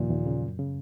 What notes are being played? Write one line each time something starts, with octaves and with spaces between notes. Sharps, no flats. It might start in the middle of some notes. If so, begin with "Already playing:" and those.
Already playing: D#2 A#2 C#3 F3
D#2
C#3
F#2
C#3